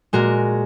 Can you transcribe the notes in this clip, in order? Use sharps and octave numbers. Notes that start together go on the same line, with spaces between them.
A#2 G#3 F#4 A#4